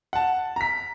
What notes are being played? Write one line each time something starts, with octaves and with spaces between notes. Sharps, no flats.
F#5 A5
A#5 B6